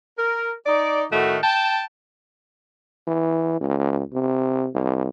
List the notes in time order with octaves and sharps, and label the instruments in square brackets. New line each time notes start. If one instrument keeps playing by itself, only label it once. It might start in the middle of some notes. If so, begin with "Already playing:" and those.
[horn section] A#4
D#4 D5
A2 D#3 A3 F#4
G5 A5
[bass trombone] E3
C#2
C3
C2